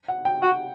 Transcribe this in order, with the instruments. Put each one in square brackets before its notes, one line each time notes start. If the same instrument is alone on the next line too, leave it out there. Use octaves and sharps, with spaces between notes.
[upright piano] F#5
G5
[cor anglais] F#4 [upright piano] F#5